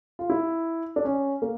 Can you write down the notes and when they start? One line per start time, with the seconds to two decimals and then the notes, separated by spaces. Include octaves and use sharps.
0.19 F4
0.30 E4
0.96 D4
1.05 C#4
1.42 A#3